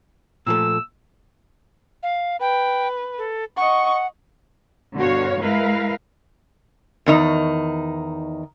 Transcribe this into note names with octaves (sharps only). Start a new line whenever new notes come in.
A#2 F3 A3 E6
F5
B4 G5
A4
D#5 F#5 C#6
G2 B2 D3 F#4 C#5 F5
G#3 E4 A#4 B4 F5
E2 D#3 D#4